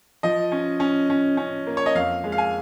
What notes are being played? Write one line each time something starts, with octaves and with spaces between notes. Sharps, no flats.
F3 D#5
C#4
C#4
C#4
C#4
A#3
C#5
D#5
F2 F5
G#3
F5
G#5